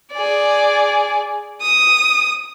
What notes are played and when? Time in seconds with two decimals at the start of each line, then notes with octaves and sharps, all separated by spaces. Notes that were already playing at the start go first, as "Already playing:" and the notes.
0.13 G#4 D5
1.61 D#6